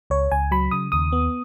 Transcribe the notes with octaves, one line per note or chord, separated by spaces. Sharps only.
C#2 C#5
C#2 G#5
F#3 B5
C#3 D#6
D#2 D#6
B3